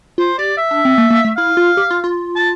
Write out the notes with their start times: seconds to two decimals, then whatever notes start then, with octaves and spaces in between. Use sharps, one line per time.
0.18 F4 C5
0.39 G4 D5
0.57 E5
0.71 D4
0.85 C4
0.98 A#3
1.10 A#3
1.25 A3
1.37 E4 F5
1.57 F4
1.77 G4
1.91 F4
2.04 F4
2.36 A5